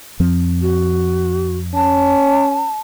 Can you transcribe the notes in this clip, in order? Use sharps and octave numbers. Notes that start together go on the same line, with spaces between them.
F2 F3 C4
F#4
C#4 A5